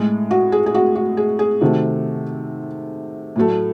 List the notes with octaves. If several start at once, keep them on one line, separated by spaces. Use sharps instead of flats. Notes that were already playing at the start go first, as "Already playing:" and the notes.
Already playing: A2 G#3
F#4
G#4
G#4
F#4
F#4
G#4
G#4
C3 D#3 A3 F#4
A2 F#3 A3